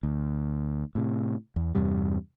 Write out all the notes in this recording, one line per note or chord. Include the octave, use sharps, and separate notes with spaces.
D2
A2 C3
E2
E2 G2 C3 G3